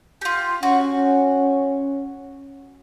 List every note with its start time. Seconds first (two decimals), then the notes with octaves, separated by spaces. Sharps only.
0.21 F4 G4
0.63 C#4 F#4